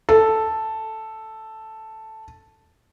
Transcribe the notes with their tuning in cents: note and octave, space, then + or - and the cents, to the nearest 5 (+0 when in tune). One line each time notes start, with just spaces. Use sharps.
A4 +0